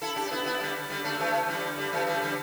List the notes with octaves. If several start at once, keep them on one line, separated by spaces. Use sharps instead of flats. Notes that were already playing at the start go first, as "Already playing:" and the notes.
E4 A4
D4 G4
D4
B3 E4
B3 E4
D3 G3
D3 G3
A3 D4
E3 A3
D3 G3
D3 G3
E3 A3
D3 G3
D3 G3